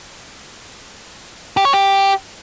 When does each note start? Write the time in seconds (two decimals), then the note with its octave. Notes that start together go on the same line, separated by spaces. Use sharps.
1.57 G4
1.65 C#5
1.73 G4